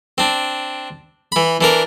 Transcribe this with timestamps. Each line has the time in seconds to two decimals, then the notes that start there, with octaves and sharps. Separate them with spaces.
0.18 C4 D4
1.32 E3 B5
1.61 E3 D4 A#4